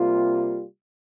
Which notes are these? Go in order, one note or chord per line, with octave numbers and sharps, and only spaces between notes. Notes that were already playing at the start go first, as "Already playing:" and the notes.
Already playing: C3 G3 A#3 F4